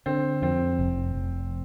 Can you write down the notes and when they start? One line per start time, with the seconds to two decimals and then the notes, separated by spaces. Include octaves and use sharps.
0.06 D3 C4
0.42 F2 C4
0.79 F1
1.15 F1